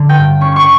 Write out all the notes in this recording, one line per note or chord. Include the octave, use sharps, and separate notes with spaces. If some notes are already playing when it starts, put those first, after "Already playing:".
Already playing: D3
G5
G2
C#4 C#6
C#6